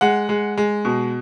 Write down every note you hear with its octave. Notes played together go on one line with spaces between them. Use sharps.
G#3 F#5
G#3
G#3
B2